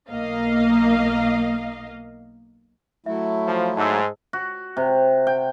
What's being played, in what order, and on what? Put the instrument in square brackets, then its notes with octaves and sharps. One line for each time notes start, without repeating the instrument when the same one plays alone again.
[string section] B1 A#3 D#5 F5
[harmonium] F#3 A3 E4 [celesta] E5
[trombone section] F3
[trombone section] G#2 [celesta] A5 E6
[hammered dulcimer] F#4
C3
G5